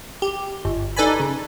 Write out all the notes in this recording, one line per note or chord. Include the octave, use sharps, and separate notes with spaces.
G4
G1
D#4 A4 B4 D5 G#5 B5
C#3